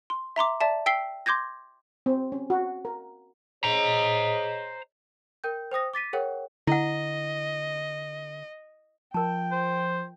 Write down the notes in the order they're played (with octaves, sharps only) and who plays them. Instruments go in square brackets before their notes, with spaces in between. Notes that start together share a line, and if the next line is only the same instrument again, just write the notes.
[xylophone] C6
E5 A#5 C6 D6
D5 E5 A5
G5 E6 B6 C7 G7
C6 D6 G6 G#6 A#6
[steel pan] C4
C#4
F#4
A#4
[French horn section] G#4 C#5 D#5 [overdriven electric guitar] C5 A#5
[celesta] A#4 G5 G6
C5 G5 D#6 A#6
D6 A6 B6 D#7
G#4 A#4 C#5 F#5 G5
[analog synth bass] D3 [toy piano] E4 F#5 [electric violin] D#5
[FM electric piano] F3 [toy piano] A#4 A5 [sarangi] G5
[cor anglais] C5